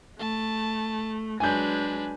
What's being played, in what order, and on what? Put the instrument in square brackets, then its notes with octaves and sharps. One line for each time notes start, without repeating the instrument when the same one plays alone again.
[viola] A3 [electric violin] A5
[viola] F#3 G#3 [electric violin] D4 B4 [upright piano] G#5 G6